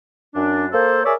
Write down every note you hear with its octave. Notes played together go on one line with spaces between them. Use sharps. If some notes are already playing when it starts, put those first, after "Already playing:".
F#2 D4
A#3 A4 C5
G#4 A#4 C#5 D5 E5